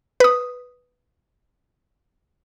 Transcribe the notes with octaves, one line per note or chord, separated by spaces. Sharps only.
B4 D#6